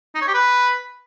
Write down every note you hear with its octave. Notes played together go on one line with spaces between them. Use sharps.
D#4
C#5
G4
B4